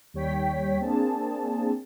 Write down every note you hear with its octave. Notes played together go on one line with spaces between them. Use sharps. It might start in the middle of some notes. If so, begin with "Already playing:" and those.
D#2 G3 C#5 G5 B6
A#3 C4 D4 G#4 A5